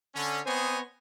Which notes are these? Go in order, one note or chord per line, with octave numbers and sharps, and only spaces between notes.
D3 C#4
B3 C4 C5 C#5 D#5 G#5